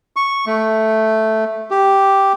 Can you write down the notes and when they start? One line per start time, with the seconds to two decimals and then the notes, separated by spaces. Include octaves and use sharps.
0.16 C#6
0.46 A3
1.71 G4